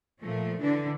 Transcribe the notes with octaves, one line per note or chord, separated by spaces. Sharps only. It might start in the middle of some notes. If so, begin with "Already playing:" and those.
A#2 F3 A3
D3 E3 D4